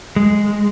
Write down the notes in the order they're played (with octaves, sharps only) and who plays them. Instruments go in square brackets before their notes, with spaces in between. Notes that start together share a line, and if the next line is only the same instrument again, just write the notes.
[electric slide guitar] G#3